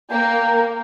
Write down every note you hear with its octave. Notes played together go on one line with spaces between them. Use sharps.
A#3 G5